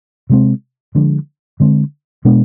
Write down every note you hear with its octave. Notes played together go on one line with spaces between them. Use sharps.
C3 G#3 C4
D3 F3 G#3 D4
D3 G#3 C4
B2 G#3 B3 D4